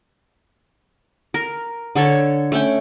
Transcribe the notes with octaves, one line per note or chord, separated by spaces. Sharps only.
A#4
D3 A4 C#5 A5
A3 C#4 G5